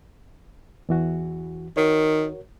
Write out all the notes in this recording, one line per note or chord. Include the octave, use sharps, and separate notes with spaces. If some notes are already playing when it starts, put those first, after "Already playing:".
E2 E3 F#4
D#3 F#4 A#4 C#5